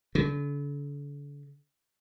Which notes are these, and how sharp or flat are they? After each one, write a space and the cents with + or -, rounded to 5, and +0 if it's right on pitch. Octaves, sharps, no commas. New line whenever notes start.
D3 -40